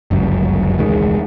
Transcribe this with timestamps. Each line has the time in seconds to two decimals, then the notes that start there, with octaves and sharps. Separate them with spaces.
0.11 G1 C#2 F#2
0.78 E1 C#2 D#3 G#3